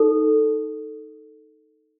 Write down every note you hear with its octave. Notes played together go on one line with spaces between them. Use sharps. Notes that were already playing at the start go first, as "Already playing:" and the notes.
Already playing: D#4 A4